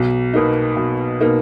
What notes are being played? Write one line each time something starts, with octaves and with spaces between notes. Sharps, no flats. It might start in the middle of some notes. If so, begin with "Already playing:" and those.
Already playing: B1
B2 A#3 D#4
B1
B2 A#3 D#4